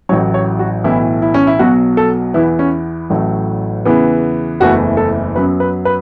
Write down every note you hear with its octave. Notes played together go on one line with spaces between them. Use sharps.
A1 A2 F#3 C#5
C#5
F#4
B1 A2 E3 E4
E4
C#4
E4
B1 B2 F#3 F#4
A4
E2 E3 B3 E4
C#4
A1 A2 F#3 A3
E2 C#3 E3 B3
F#1 E2 E3 A3 F#4
A4
F#2 F#3 B3 B4
B4
B4